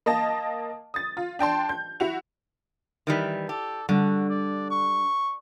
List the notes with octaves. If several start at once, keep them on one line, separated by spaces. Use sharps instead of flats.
A#3 D#5 A5
D#6 A6
F4
D4 G5 A5 C6
G6
E4 F#4 F7
D#3 E3 G3
G4 A4
D3 G3 D4 F#4
D5
C#6